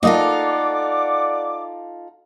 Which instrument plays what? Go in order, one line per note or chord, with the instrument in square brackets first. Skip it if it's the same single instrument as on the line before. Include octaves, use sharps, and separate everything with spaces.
[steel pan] A#3 D#5 [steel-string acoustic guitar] D#4 F4 A4 [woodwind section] D5 F#5 D6